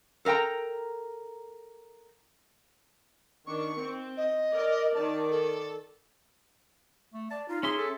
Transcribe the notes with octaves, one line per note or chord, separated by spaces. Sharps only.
A4 A#4 E5 G5 A#5
D#3 D4 C#6
C4
D#5
A#4 D5
D#3 D5 A5
A4
A3
D5 A5
D#4 F4
C#4 G#4 E5 C6
A4